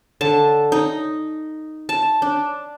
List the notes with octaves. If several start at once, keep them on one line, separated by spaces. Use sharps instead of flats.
D3 A5
D#4
A5
D4